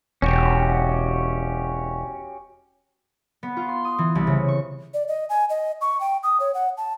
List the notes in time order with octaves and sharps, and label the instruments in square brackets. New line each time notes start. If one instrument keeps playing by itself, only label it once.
[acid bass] E1 [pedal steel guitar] C#4 F#4 G4
[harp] B3
F4
C6
D#6
E3
C2
C#3
C#6
[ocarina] D5
D#5
G#5
D#5
C#6
G5
D#6
C#5
F#5
A5